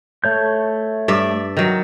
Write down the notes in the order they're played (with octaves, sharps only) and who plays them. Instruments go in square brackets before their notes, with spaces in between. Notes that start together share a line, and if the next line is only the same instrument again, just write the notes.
[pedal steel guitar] A3 C#5 G6
[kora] G2 D5 E5
D#3 F#3